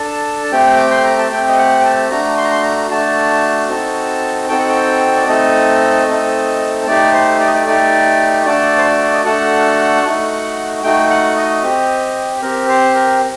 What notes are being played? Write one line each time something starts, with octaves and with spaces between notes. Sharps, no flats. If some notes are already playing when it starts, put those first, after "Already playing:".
Already playing: D4 A4 A5
A5
A3 C4 G4 G5
D6
C6
A#5
A5
A3 C4 G4 G5
D#5
F#5
G5
A5
A3 D4 F#4 A#5
C6
A#5
C6
A#5
A3 D4 F#4 A5
C4 D#4 F#4 A4
C4 D#4 F#4 A4 G5
F#5
G5
D5
A3 C4 D#4 A4 D#5
A3 C4 D#4 A4
A3 D#4 G4 D5
C5
D5
D#5
D5
A3 D#4 G4 D5
A3 D4 F#4 A4 D5
C5
D5
D#5
A3 D4 F#4 A4 F#5
A3 D#4 F#4
A3 D#4 F#4 G5
F#5
D#5
C4 G4
C4 G4 A#4
C5
A#4